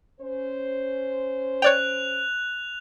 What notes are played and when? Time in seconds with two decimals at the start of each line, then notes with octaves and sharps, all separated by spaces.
0.20 C#4 C5
1.62 C#5 D5 G5 F#6 F7